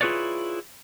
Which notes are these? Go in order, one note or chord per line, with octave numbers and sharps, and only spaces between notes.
E4 F4 G#4 B4 C#5 D5